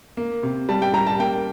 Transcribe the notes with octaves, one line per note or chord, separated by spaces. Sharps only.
A#3
C3
G3 A5
G5
G3 A#5
A5
A#3 G5